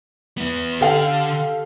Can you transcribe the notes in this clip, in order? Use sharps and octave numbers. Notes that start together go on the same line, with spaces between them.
B3 E4
D3 G4 A4 F5